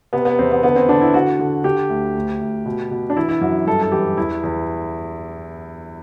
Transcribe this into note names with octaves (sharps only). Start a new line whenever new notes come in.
C3 B3
B3
E2 C4
B3
D3 B3
C4
D3 D4
E4
D3 F#4
D3
D3 G4
D2
D2
D2
B2
B2
D4
E3 E4
E4
F#2 F#4
G2 A4
A4
E3 G4
E2 E4
E2